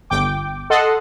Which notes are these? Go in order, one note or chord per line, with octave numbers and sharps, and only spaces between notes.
G1 G5 D6
A4 D#5 F#5 C6